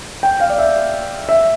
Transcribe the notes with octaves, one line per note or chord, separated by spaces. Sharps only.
G5
F5
D5
E5
E5